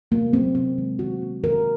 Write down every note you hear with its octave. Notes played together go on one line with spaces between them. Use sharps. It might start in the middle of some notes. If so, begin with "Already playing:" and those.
C3 A#3
F#3 A#3 C4
C3 C4
D#3 G#3
D#3 F#4
A#3
D#3 A#4